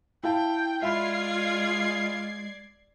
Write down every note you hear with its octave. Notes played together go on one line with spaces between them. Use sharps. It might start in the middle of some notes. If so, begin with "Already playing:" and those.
E4 F5 G5 A5
G#3 F4 D5 E5 F5 B5 G#6 C7